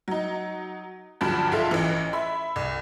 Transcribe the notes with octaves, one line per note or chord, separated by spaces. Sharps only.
F#3 D#4
D2 G2 F3 F#3 A5 B5
B1 F4 A4 E5
A1 E3
E5 B5
C2